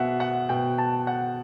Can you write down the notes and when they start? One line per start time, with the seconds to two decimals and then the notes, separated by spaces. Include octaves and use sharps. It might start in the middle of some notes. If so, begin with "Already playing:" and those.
Already playing: B2 E5 F#5
0.20 F#5
0.49 B2 G5
0.78 A5
1.07 F#5